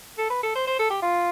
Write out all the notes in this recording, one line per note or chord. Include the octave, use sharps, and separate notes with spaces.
A4
B4
A4
C5
C5
A4
G4
F4